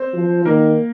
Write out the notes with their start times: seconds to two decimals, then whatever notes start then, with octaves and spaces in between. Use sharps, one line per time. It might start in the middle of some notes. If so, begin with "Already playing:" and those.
Already playing: C4 C5
0.14 F3
0.45 D#3 A#3 A#4